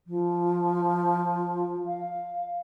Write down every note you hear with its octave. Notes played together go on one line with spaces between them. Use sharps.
F3
F5